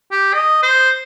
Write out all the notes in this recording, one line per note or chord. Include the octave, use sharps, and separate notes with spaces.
G4
D#5
C5